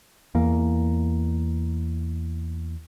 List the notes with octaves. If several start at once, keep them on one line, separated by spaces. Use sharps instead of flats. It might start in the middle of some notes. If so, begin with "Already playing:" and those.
E2 A#3